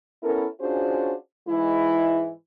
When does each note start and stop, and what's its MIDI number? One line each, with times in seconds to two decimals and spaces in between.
0.23 0.45 59
0.23 0.45 61
0.23 0.45 64
0.23 0.45 69
0.23 0.45 70
0.60 1.14 61
0.60 1.14 62
0.60 1.14 65
0.60 1.14 66
0.60 1.14 68
0.60 1.14 72
1.47 2.31 44
1.47 2.31 52
1.47 2.31 56
1.47 2.31 64